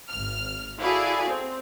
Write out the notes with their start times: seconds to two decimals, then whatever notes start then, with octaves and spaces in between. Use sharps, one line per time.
0.10 G#1 F6
0.80 E4 F#4 G#4 A4 D5 F5
1.29 C4